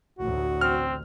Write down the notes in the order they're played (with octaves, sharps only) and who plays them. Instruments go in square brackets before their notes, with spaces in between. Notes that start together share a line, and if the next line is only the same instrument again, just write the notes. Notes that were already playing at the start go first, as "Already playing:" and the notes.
[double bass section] A1 D2 [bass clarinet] F#4
[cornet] C4 [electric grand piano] F6